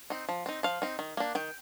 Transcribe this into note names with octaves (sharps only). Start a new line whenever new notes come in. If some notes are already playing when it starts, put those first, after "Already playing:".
C4 D#4
F3
C4 D#4
F3 F5
C4 D#4
D#3
A#3 D4
D#3 G5